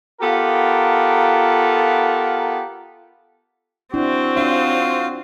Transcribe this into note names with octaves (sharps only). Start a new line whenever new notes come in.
B3 F4 G4 A4 A#4
C4 D4 E4 F#4
D4 F4 C#5